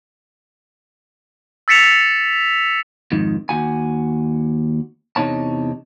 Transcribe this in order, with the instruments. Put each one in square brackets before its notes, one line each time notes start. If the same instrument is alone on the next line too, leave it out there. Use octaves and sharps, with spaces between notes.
[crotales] E6 A6 B6 C#7 E7 F7
[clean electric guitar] F2 G#2 D#3
D#2 F#4 G#5
E2 C3 D#4 C#5 A5